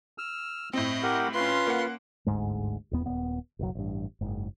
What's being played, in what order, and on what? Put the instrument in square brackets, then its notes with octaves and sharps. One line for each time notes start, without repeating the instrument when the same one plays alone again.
[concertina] E6 F6
[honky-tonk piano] A2 C4 [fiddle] D#5
[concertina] G4 A#4 F#5
[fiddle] C#4 C6 [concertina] F4 B4
[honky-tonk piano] A#3 F#5
[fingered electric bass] G1 D2 G#2 G#3
D#1 E2 B3
D#1 B3
F#1 B1 F#3
A1 G2
F#1 G#2